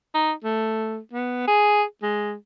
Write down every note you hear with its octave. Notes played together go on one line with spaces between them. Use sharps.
D#4
A3
B3
G#4
G#3